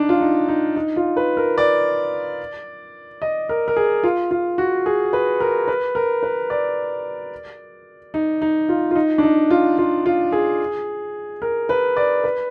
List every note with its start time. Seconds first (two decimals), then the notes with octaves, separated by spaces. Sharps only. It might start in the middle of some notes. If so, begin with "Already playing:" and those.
Already playing: D4 D#4
0.09 F4
0.21 D#4
0.49 D#4
0.76 D#4
0.96 F4
1.17 B4
1.37 A#4
1.58 D5
3.22 D#5
3.49 A#4
3.68 A#4
3.77 G#4
4.03 F4
4.31 F4
4.58 F#4
4.86 G#4
5.13 B4
5.40 A#4
5.68 B4
5.95 A#4
6.23 B4
6.50 D5
8.14 D#4
8.42 D#4
8.69 F4
8.91 F4
8.96 D#4
9.18 D4
9.23 D#4
9.50 F4
9.78 F4
10.06 F4
10.32 G#4
11.42 A#4
11.69 B4
11.97 D5
12.24 B4